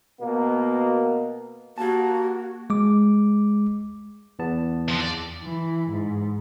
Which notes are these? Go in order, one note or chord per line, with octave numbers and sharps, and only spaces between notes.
B2 A#3
A#3 F#4 G4 A5
G#3 D6
E2 B3 A5
F3 C4
D5
E3
G#2